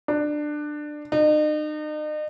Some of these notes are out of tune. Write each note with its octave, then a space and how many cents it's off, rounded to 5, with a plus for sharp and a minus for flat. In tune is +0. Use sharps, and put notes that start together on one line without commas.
D4 +20
D#4 -40